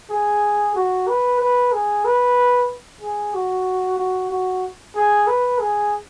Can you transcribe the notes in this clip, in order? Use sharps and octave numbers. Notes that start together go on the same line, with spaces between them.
G#4
F#4
B4
B4
G#4
B4
G#4
F#4
F#4
F#4
G#4
B4
G#4